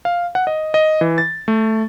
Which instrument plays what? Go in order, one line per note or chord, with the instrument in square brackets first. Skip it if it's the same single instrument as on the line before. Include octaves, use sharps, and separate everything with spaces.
[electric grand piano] F5
F#5
D#5
D#5
E3
A6
A3